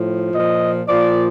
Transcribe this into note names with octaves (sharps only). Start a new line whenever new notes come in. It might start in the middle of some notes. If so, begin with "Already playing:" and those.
Already playing: A2 F3
A#2 F3 D#5
A#2 F3 D5